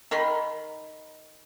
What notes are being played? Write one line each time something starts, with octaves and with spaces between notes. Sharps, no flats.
D#3 A#4 B5 C6